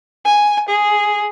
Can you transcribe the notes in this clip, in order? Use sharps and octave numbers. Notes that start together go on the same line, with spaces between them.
G#5
G#4